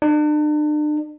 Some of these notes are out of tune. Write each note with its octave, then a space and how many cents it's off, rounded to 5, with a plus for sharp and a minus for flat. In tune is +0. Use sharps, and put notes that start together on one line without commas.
D4 +40